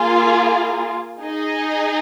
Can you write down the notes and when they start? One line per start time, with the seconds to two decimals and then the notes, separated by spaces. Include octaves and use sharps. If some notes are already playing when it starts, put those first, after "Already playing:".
Already playing: A#3 F4 G#4
1.22 D#4 G#4 D#5